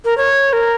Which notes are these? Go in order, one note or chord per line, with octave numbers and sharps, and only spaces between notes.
A#4
C#5
A#4